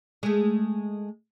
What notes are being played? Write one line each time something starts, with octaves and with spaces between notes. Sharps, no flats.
G#3 A3